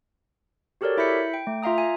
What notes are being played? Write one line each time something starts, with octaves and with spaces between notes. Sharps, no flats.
F#4 G4 A4 A#4 C#5 D5
E4 E5 B5 G6 B6 C#7
G5
A3
F4 E5 F5 A#5 D#6
G#5